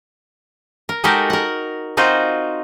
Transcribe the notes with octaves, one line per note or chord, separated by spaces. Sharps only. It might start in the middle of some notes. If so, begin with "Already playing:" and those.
A#4
G#3 D#4 F#4 G4 A4 A#4
A#4 F#5
C4 D#4 F4 F#4 C5